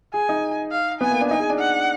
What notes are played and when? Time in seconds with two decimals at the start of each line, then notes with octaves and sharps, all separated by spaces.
0.14 G#4 G#5
0.29 D#4
0.72 F5
1.01 B3 G#5
1.11 A#3
1.21 D4
1.30 D#4 G#5
1.40 G#4
1.50 D4
1.59 F#5